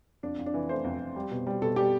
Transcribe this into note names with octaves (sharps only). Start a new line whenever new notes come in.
F2 D4
F2
D4
E3
A3 C5
F2
F2
G3
B2
G3
B2 A4
G3 G4